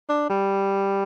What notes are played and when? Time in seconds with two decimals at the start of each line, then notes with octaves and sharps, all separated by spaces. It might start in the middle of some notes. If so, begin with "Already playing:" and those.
0.09 D4
0.30 G3